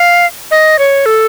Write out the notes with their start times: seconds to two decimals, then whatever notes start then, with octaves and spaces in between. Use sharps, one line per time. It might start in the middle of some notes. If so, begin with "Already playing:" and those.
Already playing: F5
0.51 D#5
0.79 C#5
1.06 A4